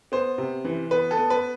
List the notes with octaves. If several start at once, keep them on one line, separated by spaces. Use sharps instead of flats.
B3 C5
C3
E3
B3 B4
A4
B3
B4